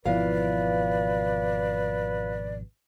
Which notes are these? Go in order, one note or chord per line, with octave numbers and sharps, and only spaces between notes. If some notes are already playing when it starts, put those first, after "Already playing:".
G#1 B2 E3 F3 F4 B4 D5 F5